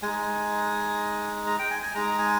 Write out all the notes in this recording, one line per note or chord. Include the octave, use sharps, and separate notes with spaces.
G#3 D#4 G#5
A#5
G5
G#5
G#5
G#3 D#4 A#5
G#5